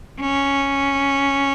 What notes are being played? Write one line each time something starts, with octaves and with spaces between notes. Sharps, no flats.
C#4